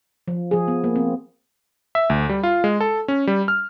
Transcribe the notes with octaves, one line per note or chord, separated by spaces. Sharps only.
F3
F3 G#4
B3
A#3
C4
E5
D2
G3
F4
G#3
A4
C#4
G3
F6